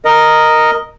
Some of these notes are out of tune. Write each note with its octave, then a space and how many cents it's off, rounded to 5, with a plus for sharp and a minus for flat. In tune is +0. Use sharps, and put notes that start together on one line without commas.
A#4 +0 D#5 +0